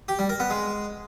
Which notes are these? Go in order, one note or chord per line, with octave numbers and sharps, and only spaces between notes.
G4
G3
A#4
B3
G#3